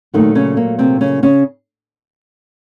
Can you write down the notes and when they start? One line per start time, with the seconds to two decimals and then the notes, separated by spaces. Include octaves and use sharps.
0.14 A#2 D#3 F#3 A3 D#4
0.35 C#3 C#4
0.57 A#3
0.79 C3 C4
1.01 C#3 C#4
1.23 C#3 C#4